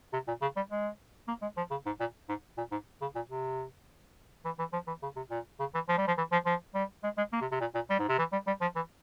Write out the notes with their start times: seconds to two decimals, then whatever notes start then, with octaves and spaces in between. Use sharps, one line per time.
0.13 C3
0.27 A#2
0.42 C#3
0.56 G3
0.71 G#3
1.28 A#3
1.42 G#3
1.57 F3
1.71 C#3
1.86 G#2
2.00 A#2
2.29 G#2
2.58 A#2
2.71 G#2
3.01 C#3
3.15 A#2
3.29 C3
4.45 E3
4.59 E3
4.73 F3
4.87 E3
5.02 C#3
5.16 C3
5.30 A#2
5.60 C#3
5.74 E3
5.89 F3
5.98 G3
6.07 F3
6.18 E3
6.32 F3
6.46 F3
6.74 G3
7.04 G#3
7.18 G#3
7.33 A#3
7.41 C3
7.51 C3
7.61 A#2
7.75 A#2
7.90 G3
7.99 G#2
8.09 C3
8.18 E3
8.32 G3
8.47 G3
8.61 F3
8.76 E3